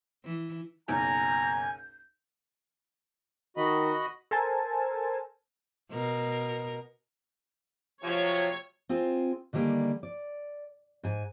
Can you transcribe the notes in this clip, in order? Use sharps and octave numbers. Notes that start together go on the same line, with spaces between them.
E3
F#1 B1 G#5 A#5 G6
D#3 F#4 D#5 B5
A4 A#4 C5 G#5 A5
B2 A#4
C3 F3 F#3 C#5
C4 F4 G#4
D3 D#3 G3 A#3 G#4
D5
G#2 G#5